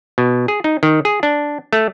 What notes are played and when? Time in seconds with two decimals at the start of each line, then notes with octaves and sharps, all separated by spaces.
0.18 B2
0.48 G#4
0.64 D#4
0.83 D#3
1.05 G#4
1.23 D4
1.73 A3